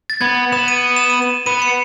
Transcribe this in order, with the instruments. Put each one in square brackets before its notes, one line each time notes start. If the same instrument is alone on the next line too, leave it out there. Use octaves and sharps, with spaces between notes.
[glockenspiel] A6
[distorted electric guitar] B3 [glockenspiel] G#6
[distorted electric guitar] B3 [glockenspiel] E7
[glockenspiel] D#7
E7
D#7
E7
[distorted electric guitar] B3 [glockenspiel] D#7
[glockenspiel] C#7